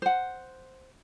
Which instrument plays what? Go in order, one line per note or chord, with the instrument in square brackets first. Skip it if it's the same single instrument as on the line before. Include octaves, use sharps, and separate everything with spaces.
[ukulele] C5 F#5